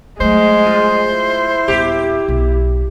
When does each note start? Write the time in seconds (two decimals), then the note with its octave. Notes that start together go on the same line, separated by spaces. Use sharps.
0.20 F#3 G#3 A3 C5
0.66 F4
1.11 E4
1.68 D#1 B3 G4
2.28 B1